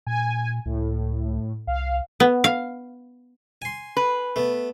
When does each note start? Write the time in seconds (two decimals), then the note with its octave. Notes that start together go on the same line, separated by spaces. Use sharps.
0.07 A#2 G#5
0.66 C#2 A2
1.67 C2 F5
2.20 B3
2.44 F5
3.62 G#5 C6
3.97 B4
4.36 A3 B3